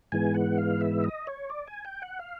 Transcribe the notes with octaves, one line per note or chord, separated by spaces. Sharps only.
G#2 E3 G#3 B3 G#5
F#5
F5
E5
D#5
C#5
D5
G#5
G5
F#5
F5